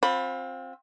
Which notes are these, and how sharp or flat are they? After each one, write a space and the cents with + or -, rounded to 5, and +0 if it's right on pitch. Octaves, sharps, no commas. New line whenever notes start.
C4 +15 F4 +35 B5 +0